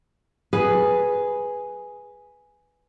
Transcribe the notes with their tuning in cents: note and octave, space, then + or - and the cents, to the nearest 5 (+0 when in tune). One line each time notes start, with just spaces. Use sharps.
G#4 +0 B4 +0